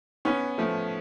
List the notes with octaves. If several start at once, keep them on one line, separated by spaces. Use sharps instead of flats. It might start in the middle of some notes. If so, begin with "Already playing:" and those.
B3 C#4
F3 A3